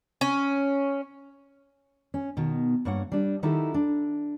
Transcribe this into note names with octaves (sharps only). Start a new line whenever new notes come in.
C#4
C#4
B2 D#3
G2 A#3 C#5 F#5
G3 D4
D#3 F#3 D#4 E4 G4 A4
D4